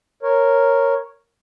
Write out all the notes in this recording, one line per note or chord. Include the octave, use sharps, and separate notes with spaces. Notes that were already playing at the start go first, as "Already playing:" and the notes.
A#4 C#5